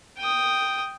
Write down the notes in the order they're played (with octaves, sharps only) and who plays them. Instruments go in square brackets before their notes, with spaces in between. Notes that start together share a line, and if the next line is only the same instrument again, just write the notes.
[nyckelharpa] G5 D#6